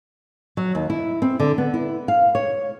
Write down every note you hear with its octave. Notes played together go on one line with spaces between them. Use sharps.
F#3
D#2
E4
C4
D3
B3
E4
F5
C#5